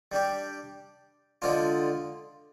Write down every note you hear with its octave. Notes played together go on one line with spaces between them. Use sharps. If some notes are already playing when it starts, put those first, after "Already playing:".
G3 D4 G4
D3 F3 G#3 D4 F4